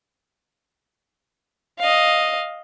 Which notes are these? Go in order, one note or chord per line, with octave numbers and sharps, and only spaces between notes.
D#5 F5